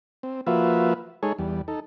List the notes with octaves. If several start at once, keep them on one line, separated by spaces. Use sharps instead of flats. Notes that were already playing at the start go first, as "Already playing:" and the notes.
C4
F3 A#3 F4 F#4 B4 E5
G#3 D#4 G#4 A4 C#5
E2 G3
D#4 A4